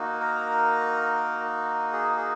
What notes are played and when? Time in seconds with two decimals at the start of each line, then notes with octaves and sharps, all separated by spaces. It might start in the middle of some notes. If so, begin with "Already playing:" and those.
Already playing: A#3 D#4 F#4
0.20 A#4
1.92 G#4
2.16 G#4